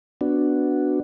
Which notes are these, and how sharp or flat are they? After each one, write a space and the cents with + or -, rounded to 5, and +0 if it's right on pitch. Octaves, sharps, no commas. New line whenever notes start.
B3 +5 D4 +0 F#4 +0